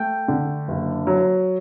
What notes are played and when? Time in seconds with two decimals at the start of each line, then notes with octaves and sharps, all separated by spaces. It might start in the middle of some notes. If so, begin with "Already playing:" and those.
Already playing: A3 G5
0.28 D3
0.68 F#1
1.07 F#3